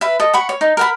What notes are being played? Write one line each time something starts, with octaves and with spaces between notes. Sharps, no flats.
B4 E5
A4 D#5
F#5 B5 C#6
C#5
D#4
A#4 F#5 B5